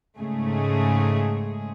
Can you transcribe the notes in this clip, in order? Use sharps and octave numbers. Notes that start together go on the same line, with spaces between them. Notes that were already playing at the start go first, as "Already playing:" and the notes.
G#2 C#3 G#3 A3 G#4